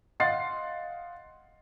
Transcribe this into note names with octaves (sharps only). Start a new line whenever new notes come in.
D#5 F5 F#5 C6 A6 C7